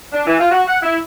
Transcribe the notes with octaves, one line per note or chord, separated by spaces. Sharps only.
D4
E3
F4
F#4
F#5
E4